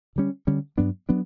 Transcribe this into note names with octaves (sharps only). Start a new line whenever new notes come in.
D3 G3 C#4
D3 G3 C#4
G2 F#3 B3 D4
F#3 B3 D4